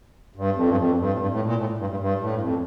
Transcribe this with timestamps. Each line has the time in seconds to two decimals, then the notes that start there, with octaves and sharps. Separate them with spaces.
0.36 G2
0.55 F2
0.68 G2
0.77 F2
0.97 G2
1.13 A2
1.18 G2
1.31 A2
1.45 A#2
1.58 A2
1.79 G2
1.90 G2
2.00 G2
2.20 A2
2.34 G2
2.40 F2